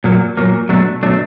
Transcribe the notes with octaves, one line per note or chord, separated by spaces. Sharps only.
A#2 F#3 A#3
A#2 F#3 A#3
B2 F#3 A3 D4
B2 F#3 A3 D4